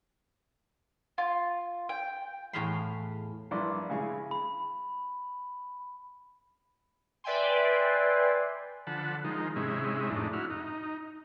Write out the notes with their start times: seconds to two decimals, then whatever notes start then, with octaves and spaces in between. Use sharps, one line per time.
1.18 F4
1.89 G5
2.53 E2 A2 G#4 F5 B5 C6
3.51 A#1 G2 E4 D5 C6 D6
3.89 C#3 G#3 E4 F5 C#6
4.31 B5
7.24 B4 D5 E5 G5 G#5 C6
8.87 D3 F3 F#5 A5 B5
9.25 D#3 F3 G#3 D#4
9.56 G#2 C3 G#3 C#4 E4
10.10 F2 A2 D4 D#4
10.33 E4 F#4 F6
10.50 D#4